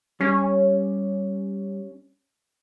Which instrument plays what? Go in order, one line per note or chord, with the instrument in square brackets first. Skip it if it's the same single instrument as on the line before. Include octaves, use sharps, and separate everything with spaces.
[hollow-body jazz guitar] G3 [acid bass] C#4